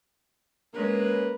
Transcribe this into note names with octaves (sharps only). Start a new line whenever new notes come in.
G#3 A#3 C#4 B4